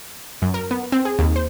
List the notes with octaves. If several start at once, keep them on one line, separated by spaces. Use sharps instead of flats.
F#2
A#4
B3
C4
G#4
D#2
C5